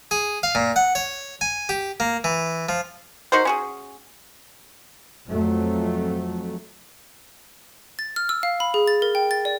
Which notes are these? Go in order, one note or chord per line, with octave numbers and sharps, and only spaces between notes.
G#4
F5
A#2
F#5
C#5
G#5
G4
A#3
E3
F3
D#4 F#4 A#4 C5
C#4 F#4 G#4
F2 F#3 A3
A6
F6
E6
F5
B5
G#4
A6
A#4
G5
A6
D5